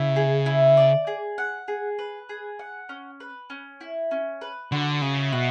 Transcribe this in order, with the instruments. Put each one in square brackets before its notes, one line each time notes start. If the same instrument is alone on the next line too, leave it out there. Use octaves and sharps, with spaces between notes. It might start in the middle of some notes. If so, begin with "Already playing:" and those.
Already playing: [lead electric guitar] C#3 [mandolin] E4
[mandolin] G#4
E4
D5
G#4
F#5
G#4
B4
G#4
F#5
C#4
B4
C#4
E4
C#4
B4
[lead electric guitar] D3 [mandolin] F#4
[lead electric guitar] C#3 [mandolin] E5
[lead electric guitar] B2 [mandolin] F#4